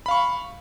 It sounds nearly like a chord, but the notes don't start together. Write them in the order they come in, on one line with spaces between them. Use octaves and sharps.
B5 F5 C#6